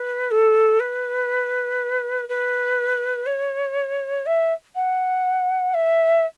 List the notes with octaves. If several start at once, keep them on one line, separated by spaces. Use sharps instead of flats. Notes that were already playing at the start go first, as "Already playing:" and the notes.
Already playing: B4
A4
B4
B4
C#5
E5
F#5
E5